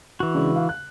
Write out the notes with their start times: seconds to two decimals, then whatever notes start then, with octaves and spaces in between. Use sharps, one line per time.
0.20 E3 F#4
0.35 C#3 G#3 D4
0.56 F5
0.69 F#6